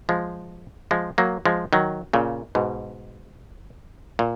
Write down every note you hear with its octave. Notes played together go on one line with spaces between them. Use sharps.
F3 G#3
F3 G#3
F#3 A#3
F3 G#3
D#3 F#3
A#2 C#3
G#2 B2
A#2